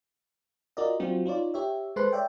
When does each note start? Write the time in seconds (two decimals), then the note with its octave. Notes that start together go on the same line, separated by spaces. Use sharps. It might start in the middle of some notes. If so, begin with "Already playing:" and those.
0.77 F4 F#4 A#4 D5 D#5
1.00 F#3 C4 D4 F4 F#4
1.26 D#4 F4 C#5 D5
1.54 G4 C#5 E5
1.96 G#3 A4 B4 C5 C6 F#6
2.13 C#5 D5 E5 G5